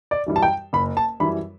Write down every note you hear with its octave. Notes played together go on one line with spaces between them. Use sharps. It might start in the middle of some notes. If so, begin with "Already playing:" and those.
D5
F#2 E3 G3
A5
G5
F#1 B5
A5
F#2 E3 G3 B5